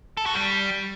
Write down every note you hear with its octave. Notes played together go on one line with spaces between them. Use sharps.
A4
F#4
G3